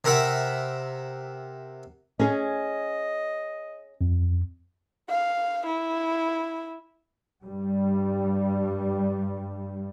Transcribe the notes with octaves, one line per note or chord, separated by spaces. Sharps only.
C3 A#4 E5 F#5 B5
C#4 G#4 D#5
F2
F5
E4
G2 G3